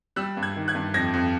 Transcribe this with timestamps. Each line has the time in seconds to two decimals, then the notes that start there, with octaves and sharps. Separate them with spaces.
0.16 G3 E6 F#6
0.37 G2
0.42 F#6 G#6
0.56 D#3
0.68 F#6 G#6
0.75 G2
0.94 F2 G#6 A#6
1.13 F2